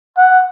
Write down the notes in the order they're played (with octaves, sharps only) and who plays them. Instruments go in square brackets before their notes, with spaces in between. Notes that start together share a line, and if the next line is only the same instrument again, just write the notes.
[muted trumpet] F#5